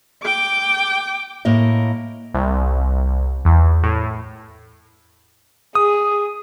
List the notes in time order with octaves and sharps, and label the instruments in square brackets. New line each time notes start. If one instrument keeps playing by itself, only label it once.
[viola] G5 D6
[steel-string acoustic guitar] A2 A#3 D#5
[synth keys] C2
E2
A2
[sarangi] G#4 [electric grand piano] D#6